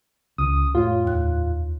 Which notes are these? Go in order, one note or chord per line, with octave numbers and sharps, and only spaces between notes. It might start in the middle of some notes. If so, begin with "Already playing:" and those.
C#2 D#6
F2 A2 F4 C#5
D#2 F#6